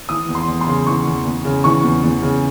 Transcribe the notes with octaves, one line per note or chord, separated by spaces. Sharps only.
E3 D#6
E2
C6
E2
C6
C#3
E3 C#6
E2
E2
C#3
E3 C#6
E2
E2
C#3